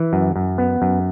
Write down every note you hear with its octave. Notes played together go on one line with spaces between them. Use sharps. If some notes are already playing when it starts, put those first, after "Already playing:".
Already playing: E3
F#2
F#2
B3
F#2